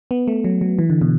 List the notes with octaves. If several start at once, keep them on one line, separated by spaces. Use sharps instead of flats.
B3
A3
F#3
F#3
E3
D3
B2